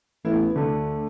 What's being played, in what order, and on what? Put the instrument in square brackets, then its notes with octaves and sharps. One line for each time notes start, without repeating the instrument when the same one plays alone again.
[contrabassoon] A1 [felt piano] B3 E4
[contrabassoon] D2 [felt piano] D3 A3